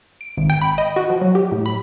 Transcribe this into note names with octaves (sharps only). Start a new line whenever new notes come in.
D7
G#1
G5
B5
D#5
F#4
F3
F#3
G4
A2
B5